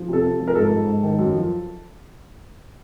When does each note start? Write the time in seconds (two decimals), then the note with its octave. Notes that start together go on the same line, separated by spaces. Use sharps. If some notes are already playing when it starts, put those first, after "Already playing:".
Already playing: F3
0.08 C3 A4
0.25 C3
0.40 F3
0.47 A#4
0.55 G#2 A4
0.71 G#2
0.88 G#2
1.03 D#3
1.19 F#2
1.35 F3